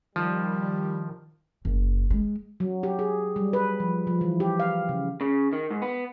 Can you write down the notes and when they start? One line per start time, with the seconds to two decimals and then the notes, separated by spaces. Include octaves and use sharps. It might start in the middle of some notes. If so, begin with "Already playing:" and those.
0.16 D#3 F3 G3
1.65 F#1
2.10 G#3
2.60 F#3
2.83 G4
2.99 G#4
3.36 G3
3.53 B4
3.80 F3
4.07 F3
4.21 E3
4.40 G4
4.60 F5
4.89 C#3
5.21 C#3
5.53 D#3
5.70 G#2
5.82 B3